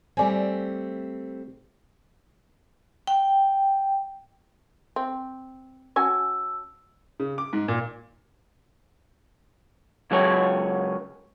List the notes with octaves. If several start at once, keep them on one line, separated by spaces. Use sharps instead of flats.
G3 A3 C4 D5 G#5
G5
C4
C#4 F#4 G#5 A5 E6
C#3
D6
G#2
A#2
C#2 F#3 G#4 C#5